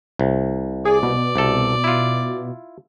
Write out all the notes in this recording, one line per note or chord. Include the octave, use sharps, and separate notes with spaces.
C2
G#4 D5
B2
C2 A4
E4 F4